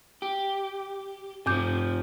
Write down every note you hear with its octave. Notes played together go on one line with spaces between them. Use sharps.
G4
G2 C3 F3 D6 G6